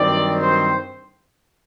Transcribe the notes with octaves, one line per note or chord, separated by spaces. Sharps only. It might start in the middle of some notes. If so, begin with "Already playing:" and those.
Already playing: G2 D#3 F#3 C4 D5
C5